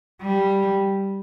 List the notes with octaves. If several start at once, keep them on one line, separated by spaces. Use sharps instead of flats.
G3